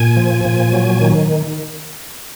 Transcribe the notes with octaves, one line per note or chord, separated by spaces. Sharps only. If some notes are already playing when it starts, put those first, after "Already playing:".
Already playing: A#2 G#5
F3
A#2
F#3
D#3